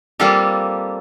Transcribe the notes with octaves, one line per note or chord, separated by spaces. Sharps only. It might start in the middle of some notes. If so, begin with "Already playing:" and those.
G3 A#3 C4 F4 G4 A4